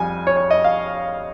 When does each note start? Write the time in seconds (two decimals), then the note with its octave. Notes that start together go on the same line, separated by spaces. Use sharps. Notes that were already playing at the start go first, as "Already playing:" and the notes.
Already playing: F2 G3 G#5
0.27 C#5
0.37 C#5
0.51 D#5
0.64 F5